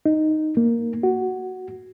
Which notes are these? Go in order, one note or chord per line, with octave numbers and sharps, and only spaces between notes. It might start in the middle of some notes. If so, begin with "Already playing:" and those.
D#4
A#3
F#4